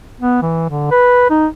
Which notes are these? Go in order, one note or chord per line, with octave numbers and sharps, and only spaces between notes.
B3
E3
D3
B4
D#4